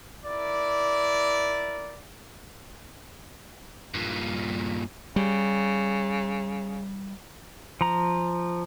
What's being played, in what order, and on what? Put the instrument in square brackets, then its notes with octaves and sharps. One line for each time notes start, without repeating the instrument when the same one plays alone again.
[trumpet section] E4 A#4 D5
[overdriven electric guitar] G2 A#2
[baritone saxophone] C#3 [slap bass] G3
[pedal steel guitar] F3 A#5